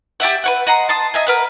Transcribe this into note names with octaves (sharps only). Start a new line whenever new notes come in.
G4 D5 E5 F#5
B4 C#5 F#5
D#5 F#5 A#5 C6
A5 C6 D#6
D#5 E5 G#5
A#4 B4 F#5